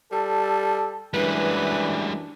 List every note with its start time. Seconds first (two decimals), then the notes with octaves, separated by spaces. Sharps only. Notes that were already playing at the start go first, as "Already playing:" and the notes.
0.12 G3 A4 A5
1.14 F#2 E3 G3 G#3 D4 B4